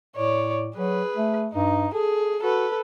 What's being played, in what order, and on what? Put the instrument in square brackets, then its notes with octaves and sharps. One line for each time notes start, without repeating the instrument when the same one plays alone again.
[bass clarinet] A2 [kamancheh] C#5 D5
[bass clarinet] F#3 [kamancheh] G#4 B4
[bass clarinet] A3
[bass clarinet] G2 [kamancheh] D#4
[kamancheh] G#4 [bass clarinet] A4
[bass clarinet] F#4 [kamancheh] A4 B4